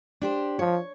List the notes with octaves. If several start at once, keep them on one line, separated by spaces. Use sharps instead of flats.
D4 G4 C5
F3 C#5